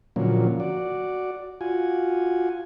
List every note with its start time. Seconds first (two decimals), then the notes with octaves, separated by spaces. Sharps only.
0.16 A#2 D3 F3 F#3 A#3 C#4
0.60 F#4 D5
1.61 F4 F#4 G#5